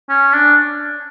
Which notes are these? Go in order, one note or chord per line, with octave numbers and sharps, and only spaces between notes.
C#4
D4